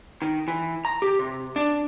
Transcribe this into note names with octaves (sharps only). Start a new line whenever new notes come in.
D#3
E3
A#5
G4
C3
D4